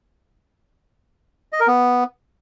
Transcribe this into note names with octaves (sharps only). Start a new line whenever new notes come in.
D#5
A#4
B3